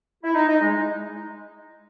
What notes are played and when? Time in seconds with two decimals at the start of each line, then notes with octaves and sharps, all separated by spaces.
0.24 E4
0.34 D#4
0.48 D#4
0.60 G#3